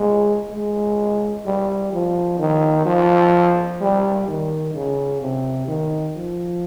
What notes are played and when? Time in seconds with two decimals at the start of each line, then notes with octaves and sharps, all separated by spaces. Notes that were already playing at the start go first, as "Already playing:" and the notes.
Already playing: G#3
0.51 G#3
1.45 G3
1.92 F3
2.38 D#3
2.85 F3
3.80 G3
4.27 D#3
4.74 C#3
5.21 C3
5.68 D#3
6.16 F3